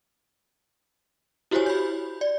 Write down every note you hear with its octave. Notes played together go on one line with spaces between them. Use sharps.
E4 F#4 G4 C5 C#5 G#5
B5 G6
D5